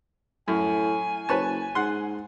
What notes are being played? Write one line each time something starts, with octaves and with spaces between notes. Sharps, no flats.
F#2 A2 G#5
F#1 B4 C#5 A5
G#2 F#5 C6